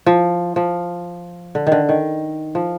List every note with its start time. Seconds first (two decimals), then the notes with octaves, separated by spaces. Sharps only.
0.06 F3
0.56 F3
1.55 D3
1.67 D#3
1.72 D3
1.89 D#3
2.55 F3